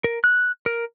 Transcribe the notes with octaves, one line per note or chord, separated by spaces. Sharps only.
A#4
F#6
A#4